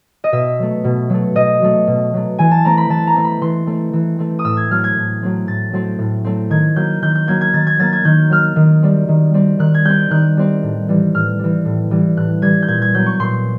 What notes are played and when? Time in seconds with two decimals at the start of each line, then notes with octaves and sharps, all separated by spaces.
0.24 D#5
0.32 B2 E5
0.59 F#3 A3
0.84 B2
1.10 F#3 A3
1.35 B2 D#5
1.62 F#3 A3
1.87 B2
2.14 F#3 A3
2.39 E3 G#5
2.51 A5
2.65 A3 C4 A#5
2.77 B5
2.89 E3 A5
3.07 A#5
3.15 A3 C4
3.24 B5
3.41 E3 C6
3.67 A3 C4
3.93 E3
4.18 A3 C4
4.39 D#6
4.44 A2 E6
4.57 G#6
4.71 F#3 A3 C4 F6
4.84 G#6
4.96 A2
5.22 F#3 A3 C4
5.47 A2 A6
5.73 F#3 A3 C4
5.99 A2
6.24 F#3 A3 C4
6.50 D#3 G#6
6.76 F#3 A#3 G6
7.02 D#3 G6
7.15 G6
7.27 F#3 A#3 G#6
7.41 G#6
7.54 D#3 A6
7.67 G#6
7.79 F#3 A#3 A6
7.93 G#6
8.05 D#3 G6
8.30 F#3 A#3 F6
8.56 D#3
8.82 G3 C4
9.08 D#3
9.34 G3 C4
9.59 D#3 F#6
9.74 G#6
9.85 G3 C4 G6
10.10 D#3 F#6
10.37 G3 C4
10.63 A2
10.88 E3 G3
11.14 A2 F6
11.39 E3 G3
11.65 A2
11.91 E3 G3
12.17 A2 F#6
12.42 E3 G3 G#6
12.62 G6
12.68 A#2 G#6
12.82 G#6
12.94 F#3 B3 G6
13.06 C#6
13.19 A#2 C6